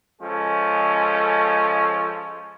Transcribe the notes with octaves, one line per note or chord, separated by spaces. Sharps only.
F3 G#3 C#4 A4